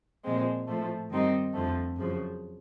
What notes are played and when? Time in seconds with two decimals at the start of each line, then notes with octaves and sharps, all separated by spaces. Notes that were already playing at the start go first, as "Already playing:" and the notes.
0.24 A#2 F3 G#3 C4
0.67 A2 F3 A3
1.10 G2 D#3 G3 C4 D#4
1.53 F2 D3 F3 A3
1.97 F#2 C#3 F3